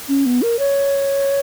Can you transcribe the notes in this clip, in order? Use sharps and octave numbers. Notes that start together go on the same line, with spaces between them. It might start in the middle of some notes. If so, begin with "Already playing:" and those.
C#4
B3
A#4
C#5